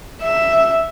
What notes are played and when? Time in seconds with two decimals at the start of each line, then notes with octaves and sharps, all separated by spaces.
0.21 E5